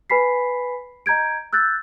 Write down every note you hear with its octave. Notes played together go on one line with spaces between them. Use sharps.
B4 G#5 B5 B6 C7
D#5 A#5 G6 G#6 D7
E6 F#6 G6 A6